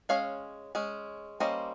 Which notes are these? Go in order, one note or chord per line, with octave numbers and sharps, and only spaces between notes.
G#3 C#4 C#5 F5
G#3 C#4
G3 A#3 C#4 C5 D#5